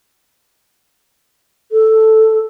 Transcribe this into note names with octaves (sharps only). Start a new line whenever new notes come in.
A4